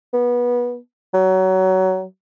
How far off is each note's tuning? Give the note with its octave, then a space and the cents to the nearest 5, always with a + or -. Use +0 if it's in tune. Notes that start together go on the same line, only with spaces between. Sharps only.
B3 -25
F#3 +20